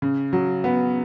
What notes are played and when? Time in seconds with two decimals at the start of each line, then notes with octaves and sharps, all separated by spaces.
0.02 C#3
0.33 F#3
0.64 B3